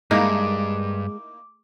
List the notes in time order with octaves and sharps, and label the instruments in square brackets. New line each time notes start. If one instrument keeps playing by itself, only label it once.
[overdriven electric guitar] G2 [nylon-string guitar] G#3 [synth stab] A#3 D#4 E4 [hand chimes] D6